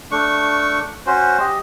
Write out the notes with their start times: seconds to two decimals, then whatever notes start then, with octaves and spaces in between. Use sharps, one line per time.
0.11 A3 D4 C#6
1.07 C#4 F#4 C5
1.40 G4 D#5